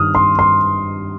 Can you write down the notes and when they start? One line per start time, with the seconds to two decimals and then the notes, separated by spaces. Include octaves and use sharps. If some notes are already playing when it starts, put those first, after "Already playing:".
Already playing: G2 D#3 G3 D#6 F6
0.15 C6
0.39 C6